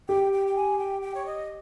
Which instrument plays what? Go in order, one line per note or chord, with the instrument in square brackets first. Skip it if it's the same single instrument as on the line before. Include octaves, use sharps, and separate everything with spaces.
[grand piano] G4 [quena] G5
[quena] G5
G5
G#5
G5
G5
C#5
D#5